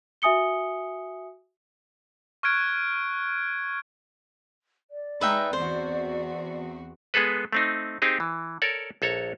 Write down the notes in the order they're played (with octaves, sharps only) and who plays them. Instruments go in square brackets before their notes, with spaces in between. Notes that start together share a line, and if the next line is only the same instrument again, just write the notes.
[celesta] F#4 E5 G#5 D#6 C#7 G7
[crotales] C#6 F6 F#6 G#6 D7
[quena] D5
[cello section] G#3 D#4 [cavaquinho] B4 E5 G5
[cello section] E2 C4 F#4 [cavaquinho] C5
[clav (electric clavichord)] G#3 B3 G#4 A4 B4
A3 C4 D#4
C4 D#4 G4 G#4
E3
A4 A#4 C#5 D5
A#1 A4 C#5 A#5